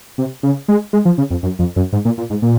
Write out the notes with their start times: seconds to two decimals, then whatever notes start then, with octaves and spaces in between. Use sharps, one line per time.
0.18 C3
0.43 C#3
0.68 G#3
0.93 G#3
1.05 F3
1.18 C#3
1.30 F2
1.43 F#2
1.59 F2
1.76 F#2
1.93 G#2
2.05 A#2
2.18 A#2
2.30 G#2
2.42 A#2